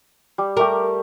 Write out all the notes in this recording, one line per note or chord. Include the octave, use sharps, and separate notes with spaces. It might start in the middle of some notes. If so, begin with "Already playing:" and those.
G3
G3 A3 G4 A#4